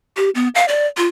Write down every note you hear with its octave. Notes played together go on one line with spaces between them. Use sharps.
G4
B3
F5
D5
F4